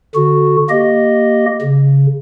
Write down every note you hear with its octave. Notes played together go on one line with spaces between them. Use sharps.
D3 F#4
A#3 G4 D#5
C#3